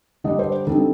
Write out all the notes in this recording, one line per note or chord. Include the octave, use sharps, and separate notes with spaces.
D3 G3 D4 D#5
C5
D3 G3 C4 D#4 A4